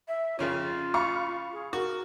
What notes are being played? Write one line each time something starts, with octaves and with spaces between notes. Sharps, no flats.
E5
F2 C#3 C#4 F4
F5 B5 C#6
G#4
F#4 A#4